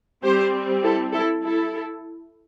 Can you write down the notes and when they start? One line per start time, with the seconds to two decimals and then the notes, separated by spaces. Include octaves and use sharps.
0.24 G3 C4 G4 C5
0.83 E4 A4
1.13 E4 A4
1.43 E4 A4